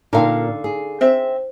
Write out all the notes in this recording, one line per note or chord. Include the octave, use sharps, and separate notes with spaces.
A#2 D3 C#4 D#4 A4 A#4 F5
G#4
C4 C5 E5